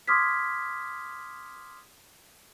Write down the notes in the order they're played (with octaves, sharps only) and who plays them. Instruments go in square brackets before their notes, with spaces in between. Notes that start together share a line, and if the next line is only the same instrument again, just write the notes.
[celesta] C6 D6 D#6 F6 G#6 B6